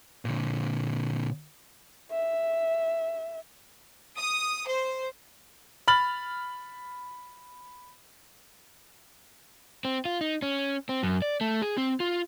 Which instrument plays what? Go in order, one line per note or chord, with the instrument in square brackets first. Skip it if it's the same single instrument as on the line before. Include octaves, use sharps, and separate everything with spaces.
[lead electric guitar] A#2 D3
[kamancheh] E5
[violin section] D#6
C5
[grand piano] B5 F6 A6 F#7
[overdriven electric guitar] C4
F4
D#4
C#4
C4
F#2
D5
A3
G#4
C4
F4